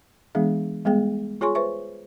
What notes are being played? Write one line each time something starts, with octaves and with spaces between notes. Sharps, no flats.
E3 G#3 B3 D4 G#4 E5
G3 G#3 B3 G#4 G5
F4 G#4 C#5 G#5 C6 C#6
B4 C5 E5 C#6